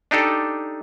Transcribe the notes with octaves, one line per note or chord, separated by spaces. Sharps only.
D4 D#4 G4 A4